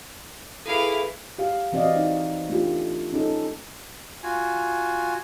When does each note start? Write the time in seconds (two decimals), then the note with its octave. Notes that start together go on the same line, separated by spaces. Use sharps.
0.66 E4 G#4 A4 B4 F5
1.39 G4 F5
1.73 E3 C4 F#4 D5 D#5 F5
1.96 D#4
2.49 A3 D4 F4 G4
3.13 C#4 D#4 A4
4.23 F4 F#4 G#5